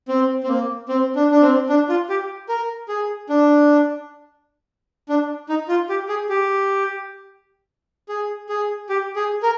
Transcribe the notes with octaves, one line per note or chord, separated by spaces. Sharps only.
C4
C4
A#3
C4
D4
D4
C4
D4
F4
G4
A#4
G#4
D4
D4
D#4
F4
G4
G#4
G4
G#4
G#4
G4
G#4
A#4